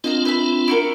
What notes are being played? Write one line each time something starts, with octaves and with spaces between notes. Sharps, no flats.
C4 D4 F4 D#5 F5 A#5
B4 E5 B5
E4 F#4 A#4